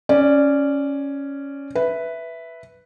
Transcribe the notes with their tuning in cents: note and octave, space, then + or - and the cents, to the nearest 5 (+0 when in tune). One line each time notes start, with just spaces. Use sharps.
C#4 +0 D5 +0
B4 +0 E5 +0